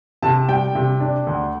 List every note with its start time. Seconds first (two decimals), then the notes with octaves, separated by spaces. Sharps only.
0.23 C3 A5
0.49 G3 G5
0.75 C3
1.00 D4
1.27 D2